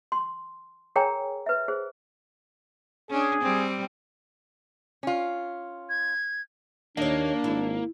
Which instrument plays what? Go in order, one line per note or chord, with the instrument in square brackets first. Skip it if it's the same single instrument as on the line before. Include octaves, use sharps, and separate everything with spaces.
[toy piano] C6
G#4 A#4 C#5 G5 G#5 A#5
B4 E5
G#4 C5
[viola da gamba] C#4 D4 [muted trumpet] G#4
[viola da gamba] G3 C4
[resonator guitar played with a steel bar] C#4 F4
[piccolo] G#6
[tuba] D#2 [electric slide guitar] A#3 [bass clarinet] D4 [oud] C#5 D#5
[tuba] G#1 [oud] E4